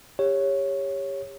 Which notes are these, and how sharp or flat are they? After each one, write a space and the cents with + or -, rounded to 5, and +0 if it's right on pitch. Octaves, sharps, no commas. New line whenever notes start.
G4 +25 C#5 -5